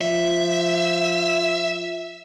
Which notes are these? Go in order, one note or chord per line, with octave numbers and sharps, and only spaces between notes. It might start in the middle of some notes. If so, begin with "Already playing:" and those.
F3 E5